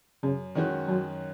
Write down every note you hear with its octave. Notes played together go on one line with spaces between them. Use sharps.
F#2 C#3
D#3 E3 G#3 C#4 F#4
F#2 F#3